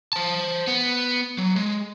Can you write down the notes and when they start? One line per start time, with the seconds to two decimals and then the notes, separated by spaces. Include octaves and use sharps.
0.13 C5 A5
0.67 B3
1.38 F#3
1.56 G#3